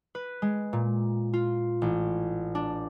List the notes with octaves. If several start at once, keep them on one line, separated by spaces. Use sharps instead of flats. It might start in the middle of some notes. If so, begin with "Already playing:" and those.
B4
G#3
A#2
F4
A1
D4